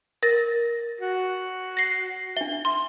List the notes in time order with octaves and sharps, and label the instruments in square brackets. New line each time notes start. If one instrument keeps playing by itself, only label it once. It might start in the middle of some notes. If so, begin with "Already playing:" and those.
[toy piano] A#4 [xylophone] A6 A#6
[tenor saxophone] F#4
[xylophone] A#6 C7
[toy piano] D4 E5 [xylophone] G7
[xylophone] C6